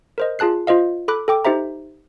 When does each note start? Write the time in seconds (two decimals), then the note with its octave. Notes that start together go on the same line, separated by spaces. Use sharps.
0.18 A#4 C5 D#5
0.39 F4 G#4 A5 F#6 C7
0.67 F4 C5 D#5 F5
1.08 A4 B5 D6 F#6
1.28 A4 G5 D6
1.45 D#4 G4 C5 E5 A#5